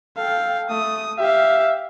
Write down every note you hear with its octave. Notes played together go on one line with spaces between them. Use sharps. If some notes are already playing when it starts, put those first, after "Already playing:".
A4 F5 G5
A3 D#6
G4 E5 F5